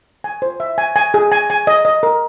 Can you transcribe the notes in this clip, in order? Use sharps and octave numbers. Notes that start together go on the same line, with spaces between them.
G#5
C5
E5
G#5
G#5
G#4
G#5
G#5
D#5
D#5
A#4